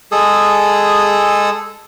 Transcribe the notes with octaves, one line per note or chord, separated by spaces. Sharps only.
G#3 G#4 A4 D#6